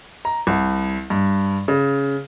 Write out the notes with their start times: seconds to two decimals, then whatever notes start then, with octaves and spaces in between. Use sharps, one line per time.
0.25 A#5
0.47 C2
1.10 G2
1.68 C#3